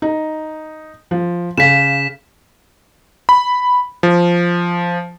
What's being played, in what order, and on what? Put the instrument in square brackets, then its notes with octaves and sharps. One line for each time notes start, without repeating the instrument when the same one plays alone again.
[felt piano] D#4
F3
[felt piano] C#3 F5 [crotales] B6 E7
[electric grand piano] B5
F3